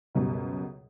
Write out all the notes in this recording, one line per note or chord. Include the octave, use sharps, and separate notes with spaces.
C#2 F#2 B2 G3